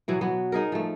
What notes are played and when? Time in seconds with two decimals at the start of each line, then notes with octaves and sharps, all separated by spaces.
0.08 B2 E3 F#3
0.21 F#3 B3
0.52 D#4 G#4 A#4
0.72 F3 A3